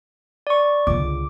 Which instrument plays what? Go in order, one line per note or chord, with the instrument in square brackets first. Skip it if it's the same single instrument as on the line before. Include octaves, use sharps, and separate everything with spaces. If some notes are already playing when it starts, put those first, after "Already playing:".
[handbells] D5 C#6
[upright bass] C#2 D3 [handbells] D6